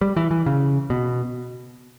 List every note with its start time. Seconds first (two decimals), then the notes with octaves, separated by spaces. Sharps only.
0.01 G3
0.16 E3
0.31 E3
0.46 C#3
0.90 B2